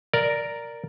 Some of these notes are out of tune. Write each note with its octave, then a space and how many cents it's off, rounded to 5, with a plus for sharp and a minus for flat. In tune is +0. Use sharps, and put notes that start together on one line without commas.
A#4 +0 D5 +0